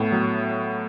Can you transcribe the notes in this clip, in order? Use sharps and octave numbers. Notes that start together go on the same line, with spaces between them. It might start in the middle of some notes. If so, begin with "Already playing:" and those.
Already playing: A2 A3 B3
F#3